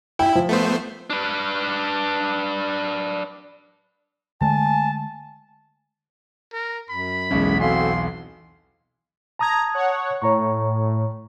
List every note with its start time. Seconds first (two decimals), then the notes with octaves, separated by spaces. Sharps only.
0.19 E4 G5
0.35 F3
0.49 A3 B3 C5
1.10 D4 B4
4.41 D3 G#3 A3 G#5 A5
6.53 A#4
6.90 F#2 B5
7.31 B1 E2 G#3 C#4
7.60 C4 F#4 A4 F5 G#5 C6
9.39 A5 A#5 D#6 G#6
9.73 C#5 F#5
10.22 A2 C#5 A#5 C#6